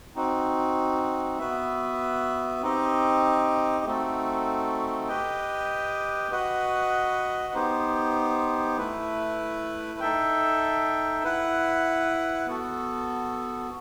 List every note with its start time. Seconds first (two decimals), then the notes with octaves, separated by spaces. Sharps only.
0.16 C4 D#4 F#4
1.38 B3 F#4 B4 E5
2.61 C4 D#4 G4 D#5
3.85 A3 C4 D#4 F#4 A4
5.08 G4 B4 D#5 G5
6.31 F#4 B4 D#5 F#5
7.54 B3 D#4 G4 C5
8.77 A3 E4 B4
10.00 D#4 A4 E5 G5
11.24 E4 B4 F#5
12.46 B3 F#4 A4